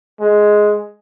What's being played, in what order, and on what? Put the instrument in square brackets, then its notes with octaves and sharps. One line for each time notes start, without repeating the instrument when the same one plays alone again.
[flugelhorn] G#3